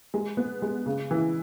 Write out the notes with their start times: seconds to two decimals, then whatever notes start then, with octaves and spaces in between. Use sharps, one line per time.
0.14 G#3
0.37 B3
0.62 G#3
0.86 C#3
1.11 E3